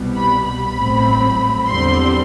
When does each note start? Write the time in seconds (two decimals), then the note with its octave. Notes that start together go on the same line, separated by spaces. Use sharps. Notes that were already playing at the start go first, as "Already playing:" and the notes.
Already playing: C2 B2 G3 B3
0.16 B5
0.46 B5
0.76 A1 A2 F#3 C4
1.67 E2 D3 G3 C4 C6